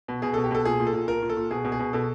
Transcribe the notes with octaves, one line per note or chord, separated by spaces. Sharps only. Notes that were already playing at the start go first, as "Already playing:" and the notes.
B2
B2 G#4
B2 A4
G4
B2 A4
A#2 G#4
A#2
A4
A#2
A#2 A#4
A#2
A4
A#2
B2 G#4
B2
G#4
B2
B2 A4